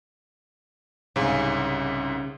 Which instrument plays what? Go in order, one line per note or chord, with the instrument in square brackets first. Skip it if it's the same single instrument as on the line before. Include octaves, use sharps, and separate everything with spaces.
[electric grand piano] C2 G#2 [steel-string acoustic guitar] C#3